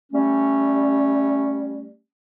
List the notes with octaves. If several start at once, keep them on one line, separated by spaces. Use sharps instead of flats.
G3 A3 C#4